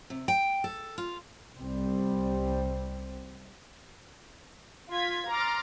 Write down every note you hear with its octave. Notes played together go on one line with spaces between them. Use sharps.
C3
G5
A4
F4
C2 G3 C4
F4 G#6 B6
A#5 C6 D6 F6 A6